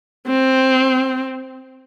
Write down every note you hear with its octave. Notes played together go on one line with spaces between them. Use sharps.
C4